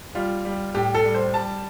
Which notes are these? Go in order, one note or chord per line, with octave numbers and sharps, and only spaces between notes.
G3 F4
G3
A2 G4
A4
G3
C5
G3 A5